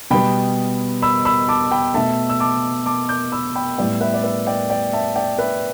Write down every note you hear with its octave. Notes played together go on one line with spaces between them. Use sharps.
B2 G3 B3 G5 B5
B5 E6
B5 E6
A5 D6
G5 B5
B2 A3 E5 A5
E6
A5 D6
A5 D6
D6 G6
B5 E6
G5 B5
A2 G3 B3 D5 G5
B4 E5
D5
B4 E5
D5 G5
D5 G5
E5 A5
D5 G5
B4 E5